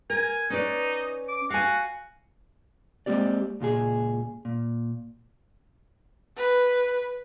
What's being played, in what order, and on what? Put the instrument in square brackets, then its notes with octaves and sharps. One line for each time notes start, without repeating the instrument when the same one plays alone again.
[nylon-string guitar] A#4 [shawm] G#5
[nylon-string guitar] C#4 B4 D5 [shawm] D#4
[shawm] D6
[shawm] F#4 [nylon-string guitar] F5 G#5
[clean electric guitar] G#3 A#3 C4 G4 D5
C#2 A#2 F4 G#4
A#2
[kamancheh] B4